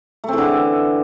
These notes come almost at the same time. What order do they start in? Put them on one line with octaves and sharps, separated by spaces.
A3 C4 E3 D3